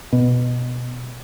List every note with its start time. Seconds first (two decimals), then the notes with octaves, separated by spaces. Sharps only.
0.13 B2